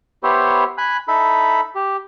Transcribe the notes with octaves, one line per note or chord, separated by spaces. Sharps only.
B3 E4 G4 C5 C#5
G#5 B5 F#6
D#4 E4 A4 B5
G4